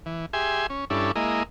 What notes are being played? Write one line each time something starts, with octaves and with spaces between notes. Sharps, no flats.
E3
G4 G#4 E5 G#5 C6
C#4
G2 C#4 D4 E4 A4
G#3 A#3 E4 D#5